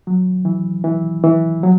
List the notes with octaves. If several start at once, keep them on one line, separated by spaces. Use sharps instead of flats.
F#3
E3
E3
E3
F#3